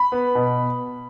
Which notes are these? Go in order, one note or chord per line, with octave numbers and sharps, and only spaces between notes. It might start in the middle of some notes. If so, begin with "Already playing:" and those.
Already playing: B5
B3
B2